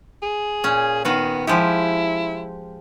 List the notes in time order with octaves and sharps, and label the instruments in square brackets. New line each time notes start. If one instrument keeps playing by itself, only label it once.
[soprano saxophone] G#4
[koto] A#2 C#4
[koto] D#3 F#4 F5 [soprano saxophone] B3
[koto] F3 G#3 G4 [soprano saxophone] E4